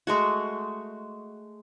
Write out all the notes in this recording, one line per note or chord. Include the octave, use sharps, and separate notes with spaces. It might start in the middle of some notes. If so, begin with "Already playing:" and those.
G#3 A3 F#4